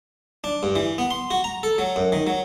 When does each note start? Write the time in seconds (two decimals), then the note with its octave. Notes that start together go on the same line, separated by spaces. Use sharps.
0.44 D4
0.63 G2
0.76 E3
0.98 B3
1.11 C6
1.31 F#4
1.44 A#5
1.63 A4
1.78 F#3
1.96 F#2
2.12 D#3
2.27 F#3